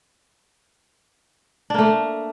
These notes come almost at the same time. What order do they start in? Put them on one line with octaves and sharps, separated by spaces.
D4 A#3 A3